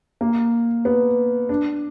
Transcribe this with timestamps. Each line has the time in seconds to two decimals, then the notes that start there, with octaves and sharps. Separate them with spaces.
0.21 A#3
0.85 B3
1.49 D4